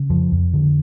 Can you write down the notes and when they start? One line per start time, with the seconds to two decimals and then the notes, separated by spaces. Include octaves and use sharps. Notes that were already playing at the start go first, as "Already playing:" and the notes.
Already playing: C#3
0.10 F2 F3
0.32 F2
0.53 D3